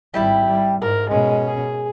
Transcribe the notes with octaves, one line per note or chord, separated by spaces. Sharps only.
G#1 G3 E4 G4 G5 A5
G3
G#2 A#4 D5
B2 G#3 C#4
G#4